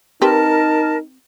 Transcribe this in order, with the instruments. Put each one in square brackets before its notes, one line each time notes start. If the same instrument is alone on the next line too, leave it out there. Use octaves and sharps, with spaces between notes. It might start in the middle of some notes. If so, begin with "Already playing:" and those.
[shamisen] C4 G4 B4 [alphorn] D#4 [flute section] A#4 [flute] A5